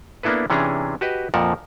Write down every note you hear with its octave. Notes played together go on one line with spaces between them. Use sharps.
A#3 B3 D4 E4 A4 B4
C3 E3 C#4 D4 G#4 A#5
F#4 G4 B4 D#5
F2 A#2 F3 A#4 F#5 A5